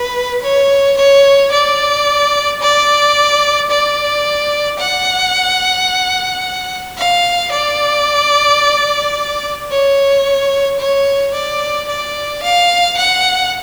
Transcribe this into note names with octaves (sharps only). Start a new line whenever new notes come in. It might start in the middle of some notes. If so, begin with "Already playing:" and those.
Already playing: B4
C#5
C#5
D5
D5
D5
F#5
F5
D5
C#5
C#5
D5
D5
F5
F#5